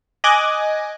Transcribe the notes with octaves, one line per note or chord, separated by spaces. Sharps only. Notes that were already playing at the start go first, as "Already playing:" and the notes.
D#5 G#5 D6 F#6 G#6 A#6